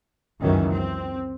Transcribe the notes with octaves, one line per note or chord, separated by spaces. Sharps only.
C#2 F#2 D#3 E3 C#4
C4